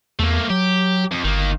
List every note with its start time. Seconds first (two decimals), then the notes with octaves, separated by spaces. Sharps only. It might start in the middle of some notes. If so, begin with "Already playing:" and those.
0.19 E2 A3 A#3
0.50 F#3 G4
1.12 F2
1.24 G1 D#3 A#3